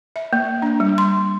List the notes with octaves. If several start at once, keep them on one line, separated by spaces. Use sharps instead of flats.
E5
A#3
D4
G3
C6